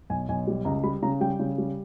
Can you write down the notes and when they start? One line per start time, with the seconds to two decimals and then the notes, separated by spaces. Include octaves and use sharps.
0.10 B1 G#5
0.29 B1 G#5
0.47 G3
0.65 C#2 A#5
0.83 G3 B5
1.03 C#3 A#5
1.21 G3 G5
1.40 C#3
1.58 G3